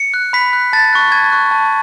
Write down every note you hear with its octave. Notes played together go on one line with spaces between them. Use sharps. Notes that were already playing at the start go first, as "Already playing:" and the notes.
Already playing: C#7
F#6
B5 B6
F#6
A5 A6
C#6 F#6
A5 G#6
C#6 F#6
A5